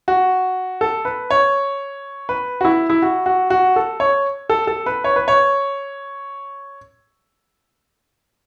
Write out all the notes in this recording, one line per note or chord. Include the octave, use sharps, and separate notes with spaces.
F#4
A4
B4
C#5
B4
F#4
E4
E4
F#4
F#4
F#4
A4
C#5
A4
A4
B4
C#5
B4
C#5